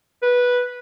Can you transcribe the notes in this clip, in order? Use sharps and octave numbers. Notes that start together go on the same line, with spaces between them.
B4